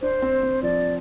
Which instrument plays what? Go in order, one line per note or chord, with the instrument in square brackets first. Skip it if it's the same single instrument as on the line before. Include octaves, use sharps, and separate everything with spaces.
[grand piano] D4 [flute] C5
[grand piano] C4
C4
[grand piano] F3 [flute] D5